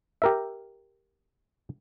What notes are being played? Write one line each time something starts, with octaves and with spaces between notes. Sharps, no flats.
G4 A#4 E5